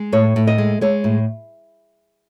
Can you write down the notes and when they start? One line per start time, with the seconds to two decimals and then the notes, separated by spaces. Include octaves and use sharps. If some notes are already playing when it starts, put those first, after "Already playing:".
Already playing: G#3
0.12 A2 C#5
0.36 A2
0.47 D#5
0.58 G#3
0.81 G#3 C#5
1.04 A2